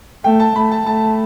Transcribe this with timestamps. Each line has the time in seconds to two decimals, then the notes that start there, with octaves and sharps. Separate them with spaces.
0.24 A3 G5
0.40 A5
0.56 A3 B5
0.72 A5
0.86 A3 A5